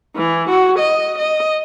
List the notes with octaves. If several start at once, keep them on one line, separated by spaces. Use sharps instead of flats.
E3
F#4
D#5
D#5